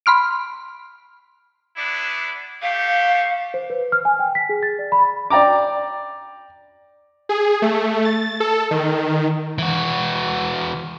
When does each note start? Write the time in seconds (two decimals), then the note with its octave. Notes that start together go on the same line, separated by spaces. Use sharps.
0.06 B5 C6 F6 D7
1.76 B3 D4 E4
2.62 A3 G4 F5
3.54 C5
3.70 B4
3.92 F6
4.05 G#5
4.19 G5
4.35 B6
4.49 G#4
4.63 A6
4.79 D5
4.92 B5
5.30 D5 G5 A#5 D6
7.29 G#4
7.62 A3
8.05 A6
8.40 A4
8.71 D#3
9.58 E3 F#4